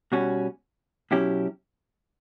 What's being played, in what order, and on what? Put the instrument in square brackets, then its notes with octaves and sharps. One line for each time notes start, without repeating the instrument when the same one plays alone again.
[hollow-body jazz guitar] B2 G3 C#4 F#4
B2 F#3 C#4 E4 G4